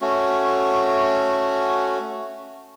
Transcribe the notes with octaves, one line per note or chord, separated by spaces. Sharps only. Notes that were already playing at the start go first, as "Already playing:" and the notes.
A3 C#4 F#4